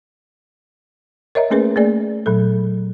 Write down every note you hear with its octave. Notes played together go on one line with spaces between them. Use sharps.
A#4 C#5 D#5 E5 A#5
A3 A#3 C#4 G#4 A#4 B4
A3 A#3 G#4 D5
A#2 F#3 A4